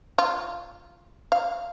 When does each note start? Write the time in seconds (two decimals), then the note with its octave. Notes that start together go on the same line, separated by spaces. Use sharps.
0.18 F4
1.32 F5